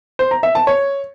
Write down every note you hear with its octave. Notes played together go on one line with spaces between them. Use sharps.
C5
A#5
E5
A5
C#5